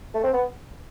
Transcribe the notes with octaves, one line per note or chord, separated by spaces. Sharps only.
A3
C4
B3